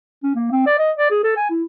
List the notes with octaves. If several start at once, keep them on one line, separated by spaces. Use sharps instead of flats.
C#4
A#3
C4
D5
D#5
D5
G#4
A4
G#5
E4